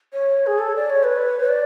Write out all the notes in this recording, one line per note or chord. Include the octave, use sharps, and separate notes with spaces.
C#5
G#4
A4
D5
C#5
B4
D5